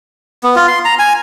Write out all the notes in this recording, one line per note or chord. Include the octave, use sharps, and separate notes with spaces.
B3
F4
C6
A#5
G#5